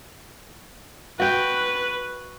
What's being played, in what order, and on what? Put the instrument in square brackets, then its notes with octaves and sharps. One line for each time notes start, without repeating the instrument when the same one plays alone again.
[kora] F#4 G5 [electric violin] B4